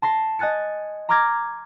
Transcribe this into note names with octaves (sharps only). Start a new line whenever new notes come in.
A5 C6 A#6 C7
D#5 G#5 F#6 A6 C#7
A#5 C6 D6 F6 G#6 A#6